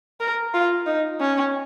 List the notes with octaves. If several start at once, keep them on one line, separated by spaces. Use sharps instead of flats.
A#4
F4
D#4
C#4